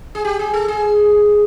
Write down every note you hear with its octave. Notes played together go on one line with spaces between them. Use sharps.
G#4
G4
G#4
A4
G#4